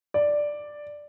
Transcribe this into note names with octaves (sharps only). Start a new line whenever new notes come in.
D5